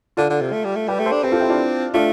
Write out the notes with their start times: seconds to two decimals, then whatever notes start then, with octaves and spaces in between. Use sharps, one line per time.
0.17 D3 F4 A4
0.30 D3
0.41 C3
0.53 A3
0.65 G3
0.76 A3
0.88 G3 G4 B4
1.00 A3
1.06 A4 C5
1.12 D4
1.23 C4 G4 B4
1.32 F4 A4
1.40 E4 G4
1.49 D4 F4
1.94 A3 D4 F4